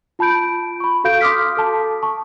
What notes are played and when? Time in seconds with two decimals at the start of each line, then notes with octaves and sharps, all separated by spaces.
0.19 F4 A5 B5 G6 D7
0.80 B5 C#6
1.04 F#4 A4 F5 G6 D7
1.21 C6 D6 D#6 F6 B6
1.57 A4 A5
2.03 A5 C#6